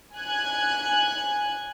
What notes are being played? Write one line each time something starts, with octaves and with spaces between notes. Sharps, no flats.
G#5 F#6 G#6